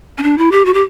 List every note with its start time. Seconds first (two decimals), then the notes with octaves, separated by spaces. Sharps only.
0.18 C#4
0.23 D4
0.38 E4
0.52 G4
0.65 F#4
0.74 G4